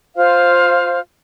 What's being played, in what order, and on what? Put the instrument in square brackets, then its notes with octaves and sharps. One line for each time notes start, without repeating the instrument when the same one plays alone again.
[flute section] F4 C5 F5